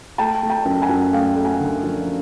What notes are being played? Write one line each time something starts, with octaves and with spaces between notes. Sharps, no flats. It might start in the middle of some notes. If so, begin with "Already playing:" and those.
A3 G5 A5
A3
G5 A5
F#2
F#5 G#5
F#2
A3 F5 G5
A3
F#5 G#5
D3
F3